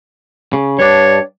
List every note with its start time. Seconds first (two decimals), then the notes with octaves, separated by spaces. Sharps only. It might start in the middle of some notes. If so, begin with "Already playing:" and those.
0.53 C#3
0.79 G2 D4 C#5